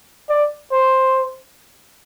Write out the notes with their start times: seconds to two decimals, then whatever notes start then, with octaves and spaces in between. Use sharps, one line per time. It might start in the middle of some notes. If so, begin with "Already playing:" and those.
0.30 D5
0.71 C5